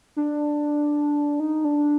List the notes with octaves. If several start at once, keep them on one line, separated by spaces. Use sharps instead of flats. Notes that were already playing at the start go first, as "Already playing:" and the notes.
D4
D#4
D4